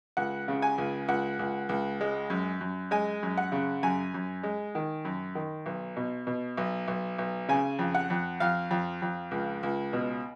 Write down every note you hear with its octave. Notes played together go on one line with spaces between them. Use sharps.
C#2 F#5
C#3
G#5
C#2
C#2 F#5
C#2
C#2
G#3
F#2
F#2
G#3 G#5
F#2
F#5
C#3
F#2 G#5
F#2
G#3
D#3
F#2
D#3
B1
B2
B2
B1
B1
B1
C#3 G#5
F2
F#5
F2
F2 F5
F2
F2
C#2
C#2
B2